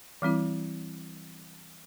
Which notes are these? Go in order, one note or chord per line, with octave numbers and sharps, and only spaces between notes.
E3 G3 C4 E4